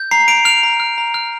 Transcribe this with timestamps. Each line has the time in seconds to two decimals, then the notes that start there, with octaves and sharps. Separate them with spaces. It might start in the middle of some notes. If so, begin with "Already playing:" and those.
Already playing: G6
0.11 A#5 C7
0.28 A#5 D7
0.45 F6 F7
0.63 A#5
0.80 F6
0.98 A#5
1.14 F6